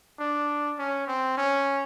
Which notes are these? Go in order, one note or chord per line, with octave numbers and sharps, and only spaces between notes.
D4
C#4
C4
C#4